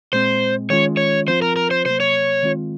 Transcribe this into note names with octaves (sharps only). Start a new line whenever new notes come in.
A#2 G#3 C4 C5
D#3 G#3 C#4 F4 C#5
C#5
F3 C4 F4 C5
A#4
A#4
C5
C3 F#3 A#3 C5
C#5
D#3 G#3 C4 F4